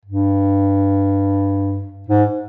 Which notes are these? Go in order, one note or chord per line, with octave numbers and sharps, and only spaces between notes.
G2
G#2